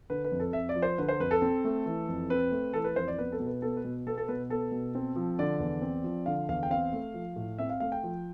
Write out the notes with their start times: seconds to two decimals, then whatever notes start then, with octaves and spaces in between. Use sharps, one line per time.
0.10 D3 B4
0.24 B4
0.32 F2
0.40 A4
0.53 F2 E5
0.69 D5
0.75 F3
0.82 C5
0.98 D3 B4
1.09 C5
1.20 F2 B4
1.31 A4
1.42 C4
1.64 A3
1.86 E3
2.09 F2
2.30 C4 B4
2.51 A3
2.73 E3 A4
2.84 B4
2.96 F2 C5
3.08 D5
3.18 B3 B4
3.32 A4
3.40 B2
3.47 B4
3.62 B3 A4
3.77 B4
3.84 B2
4.07 B3 A4
4.18 A4
4.28 B2 B4
4.50 B3 A4
4.72 B2
4.95 C4
5.16 F3
5.39 D3 D5
5.60 E2
5.82 C4
6.04 F3
6.26 D3 F5
6.49 E2 F5
6.63 G5
6.70 C4 F5
6.93 A3
7.14 F3
7.36 A2
7.58 C4 E5
7.70 F5
7.80 A3 F5
7.92 G5
8.03 F3